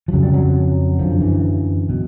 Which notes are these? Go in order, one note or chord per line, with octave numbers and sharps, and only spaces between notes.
F3
F2 C#3 F#3
G3
F#3
F#2 D3 F3
E3
B2